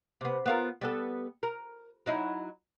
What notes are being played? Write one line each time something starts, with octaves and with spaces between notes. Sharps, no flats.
C3 B3
B3 F4 A#4
G3 B3 A4
A#4
F#3 D#4 E4